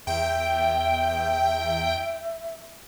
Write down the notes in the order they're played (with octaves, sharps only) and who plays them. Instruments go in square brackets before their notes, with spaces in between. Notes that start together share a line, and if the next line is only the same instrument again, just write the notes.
[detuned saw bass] E2 [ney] E5 [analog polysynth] G5